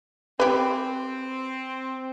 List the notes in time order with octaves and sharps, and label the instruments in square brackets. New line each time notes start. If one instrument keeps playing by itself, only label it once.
[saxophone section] C4 [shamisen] G4 B4